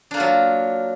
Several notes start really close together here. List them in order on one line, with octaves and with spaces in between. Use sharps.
D4 A#3 F4 F#3